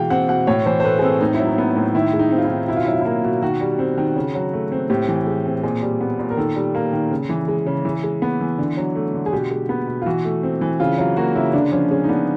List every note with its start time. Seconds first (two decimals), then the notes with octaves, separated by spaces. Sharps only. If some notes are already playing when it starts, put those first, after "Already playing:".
Already playing: B2 E3 G#3 F5 G5
0.10 C4 F#5
0.28 B2 F#5
0.47 A2 C#5
0.66 E3 C5
0.80 C5
0.83 A3 B4
0.99 G#4
1.02 C4 A4
1.21 A2 D#4
1.34 E4
1.40 F#3
1.47 D#4
1.58 B3
1.76 A2
1.95 D#3 E4
2.13 G#3
2.19 D#4
2.31 C4
2.38 F4
2.44 D#3 E4
2.68 B2 E4
2.76 F4
2.85 F#3 E4
2.93 F4
3.01 A#3 E4
3.24 B2
3.42 D#3 F#4
3.61 G3
3.79 C4
3.97 D#3
4.16 C#3
4.35 F#3
4.53 A3
4.72 C4
4.90 A2 G4
5.08 E3
5.27 G#3 G4
5.45 C4
5.63 A#2 G#4
5.82 G3
6.01 B3
6.19 A#2
6.30 A#4
6.37 D#3 A4
6.56 G3
6.75 A#3
6.93 D#3
7.11 C#3
7.29 E3
7.48 G#3
7.66 C#3
7.85 E3
8.04 G#3
8.22 B3
8.41 E3
8.58 D3
8.77 F#3
8.95 A3
9.14 D3
9.26 G#4
9.33 B2 G4
9.51 G#3
9.69 B3
9.87 B2
10.02 F4
10.06 E3 F#4
10.24 A3
10.43 C4
10.61 E3
10.80 C#3 F4
10.98 F#3 F4
11.17 A#3 F#4
11.35 C#3 E4
11.53 D3 D4
11.72 F3 C#4
11.91 G#3 C#4
12.04 D#4
12.09 B3 D4